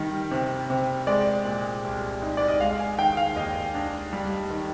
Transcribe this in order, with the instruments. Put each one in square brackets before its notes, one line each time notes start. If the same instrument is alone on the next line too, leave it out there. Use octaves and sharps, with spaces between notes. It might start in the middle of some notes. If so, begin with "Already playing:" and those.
Already playing: [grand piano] D#3 G3
C3
C3
G#3 D5
A#2
C2
D#4
D5
D#5
G#3 F5
G#5
D#3 G5
F5
D#2 D#5
D4
G3
D#3